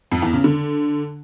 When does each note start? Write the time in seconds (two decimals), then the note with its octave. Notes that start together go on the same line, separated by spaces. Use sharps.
0.12 F2
0.22 E2
0.33 C#3
0.44 D3